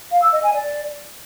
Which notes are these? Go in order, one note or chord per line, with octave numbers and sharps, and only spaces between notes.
F5
E6
D#5
G#5
D5